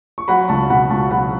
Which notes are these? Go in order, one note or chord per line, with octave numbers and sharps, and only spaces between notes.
C#6
F#3 F#5 B5
C#2 A5 C#6
B2 F#5 B5
C#2 A5 C#6
F#3 F#5 B5